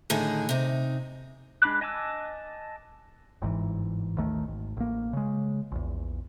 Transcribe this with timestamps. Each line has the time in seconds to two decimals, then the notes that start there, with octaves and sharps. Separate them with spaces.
0.10 A2 D3 D#3 D#4 G#4
0.49 C3 D#4
1.62 G#3 D4 B5 D6 F#6
1.81 D#5 G#5 A5 D6 E6
3.42 G1 G#2 C#3 E3
4.17 A1 D#2 D#3 A3
4.48 G#1
4.77 A1 A#3
5.13 C#3 G#3
5.72 A#1 E2